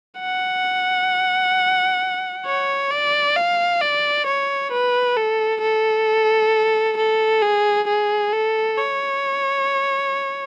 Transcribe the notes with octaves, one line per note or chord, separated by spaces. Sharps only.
F#5
C#5
D5
F5
D5
C#5
B4
A4
A4
A4
G#4
G#4
A4
C#5